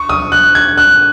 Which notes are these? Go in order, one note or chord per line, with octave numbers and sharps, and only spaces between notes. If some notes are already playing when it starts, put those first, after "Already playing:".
Already playing: C#6
D#6
F#6
G#6
F#6